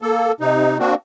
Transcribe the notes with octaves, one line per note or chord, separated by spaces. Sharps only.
A#3 A4
C3 D#4
A#3 C4 D4 F#4